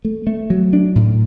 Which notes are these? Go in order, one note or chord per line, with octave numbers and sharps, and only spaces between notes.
A3
A3
F#3
D4
A2